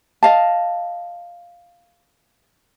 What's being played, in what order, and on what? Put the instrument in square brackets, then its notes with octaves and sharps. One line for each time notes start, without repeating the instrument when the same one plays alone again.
[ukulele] D#5 F5 A5